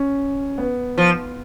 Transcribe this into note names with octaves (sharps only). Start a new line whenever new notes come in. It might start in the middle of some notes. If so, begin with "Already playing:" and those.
Already playing: C#4
B3
F3